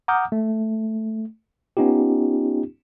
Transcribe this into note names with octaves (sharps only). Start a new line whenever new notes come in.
F#5 A#5 D6 D#6 F6 G6
A3
B3 C#4 D#4 F4 G4